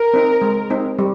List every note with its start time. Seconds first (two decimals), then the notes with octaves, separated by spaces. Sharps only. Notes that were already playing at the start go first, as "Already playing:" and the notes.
Already playing: A#4
0.14 C4 D#4
0.42 G#3
0.70 C4 D#4
0.99 G3